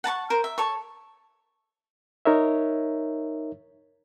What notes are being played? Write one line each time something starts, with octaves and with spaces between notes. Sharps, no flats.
F#5 A5 A#5 C#6
A#4 C5
E5
A4 C#5 C#6
D#4 A#4 C#5 E5